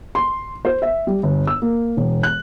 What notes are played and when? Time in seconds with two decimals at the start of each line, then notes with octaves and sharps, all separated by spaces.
0.15 C6
0.65 C5
0.82 E5
1.07 G3
1.23 G1
1.47 E6
1.62 A#3
1.97 E1
2.23 F#6